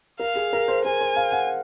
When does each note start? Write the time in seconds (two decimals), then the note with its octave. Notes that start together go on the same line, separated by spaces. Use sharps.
0.20 A#4 F5
0.36 G#4
0.53 A#4
0.68 C5
0.85 A#4 G#5
1.01 C5
1.16 F5
1.32 F#5